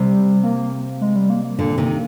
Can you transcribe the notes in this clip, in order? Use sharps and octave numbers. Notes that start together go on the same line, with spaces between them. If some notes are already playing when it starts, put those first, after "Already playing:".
Already playing: C3 G3
A#3
G#3
G3
A#3
A#3
A#2 D3
C3 D#3